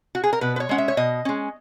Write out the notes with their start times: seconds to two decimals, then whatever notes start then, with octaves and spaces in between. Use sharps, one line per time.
0.15 F#4
0.24 G#4
0.33 A#4
0.41 B2 B4
0.56 B4
0.60 C#5
0.69 G#3 C#4 F#5
0.78 E5
0.88 C#5
0.97 B2 D#5
1.25 G#3 C#4